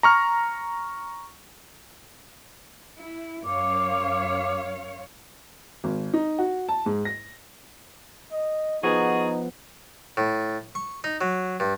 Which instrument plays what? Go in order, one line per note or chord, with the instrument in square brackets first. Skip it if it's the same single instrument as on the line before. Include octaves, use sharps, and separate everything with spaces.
[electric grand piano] A#5 C#6 F6
[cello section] E4
[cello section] F#2 C#5 F5 [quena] D6
[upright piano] G#1
D#4
F#4
A5
G#2
A#6
[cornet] D#5
[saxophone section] D#3 F#4 G#4 [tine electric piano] F3 B3 B4 [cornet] D#4
[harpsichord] A2
C#6
D#4
F#3
G2